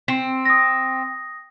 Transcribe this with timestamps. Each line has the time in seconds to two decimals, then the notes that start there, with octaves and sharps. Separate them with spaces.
0.08 C4
0.45 D#6 A#6